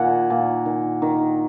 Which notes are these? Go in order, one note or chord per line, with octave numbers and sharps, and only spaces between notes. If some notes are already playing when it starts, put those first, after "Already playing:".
Already playing: A#2 D#3 F#5 G#5
A#2
D#3
D#3